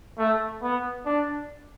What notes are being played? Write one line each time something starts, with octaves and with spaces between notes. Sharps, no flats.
A3
B3
D4